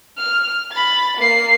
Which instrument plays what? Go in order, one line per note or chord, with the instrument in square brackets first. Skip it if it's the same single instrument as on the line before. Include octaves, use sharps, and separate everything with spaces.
[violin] F6
B5 A6
A#3 C7